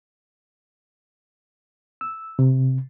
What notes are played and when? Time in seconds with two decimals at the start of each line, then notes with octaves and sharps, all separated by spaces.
2.01 E6
2.39 C3